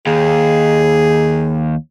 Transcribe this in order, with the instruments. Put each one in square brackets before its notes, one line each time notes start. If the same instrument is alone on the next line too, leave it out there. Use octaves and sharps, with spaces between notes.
[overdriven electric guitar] D#2 [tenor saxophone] G#4